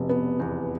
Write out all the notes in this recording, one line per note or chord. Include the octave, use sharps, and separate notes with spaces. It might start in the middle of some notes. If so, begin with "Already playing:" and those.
Already playing: F1 B2
B3
E2